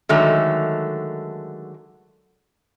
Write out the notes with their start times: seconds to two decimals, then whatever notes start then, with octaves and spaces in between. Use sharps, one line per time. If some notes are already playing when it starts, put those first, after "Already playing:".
0.09 D3 D#3 F#3 G#3 A3